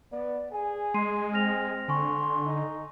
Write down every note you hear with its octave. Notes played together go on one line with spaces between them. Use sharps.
B3 D5
G#4 G#5
G#3 C6 C7 D#7
C4 F6 A#6 F7
D3 G#5 C6 C#6
D#4